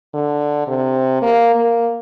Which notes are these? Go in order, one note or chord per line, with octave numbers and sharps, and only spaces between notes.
D3
C3
A#3
A#3